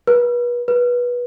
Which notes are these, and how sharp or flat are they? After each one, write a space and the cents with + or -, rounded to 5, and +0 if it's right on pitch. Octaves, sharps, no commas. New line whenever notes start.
B4 -35
B4 -20